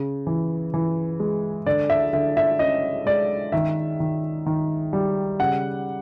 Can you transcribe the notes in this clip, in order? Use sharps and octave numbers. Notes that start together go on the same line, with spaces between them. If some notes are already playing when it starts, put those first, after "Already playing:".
Already playing: C#3
E3
E3
G#3
D3 D5
E5
D3 E5
E5
C#4 D#5
G#3 D5
D#3 E5
D#3
D#3
G3
C#3 F#5